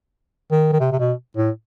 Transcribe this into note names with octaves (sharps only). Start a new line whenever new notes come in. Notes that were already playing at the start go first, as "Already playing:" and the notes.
D#3
D#3
C3
C3
B2
A2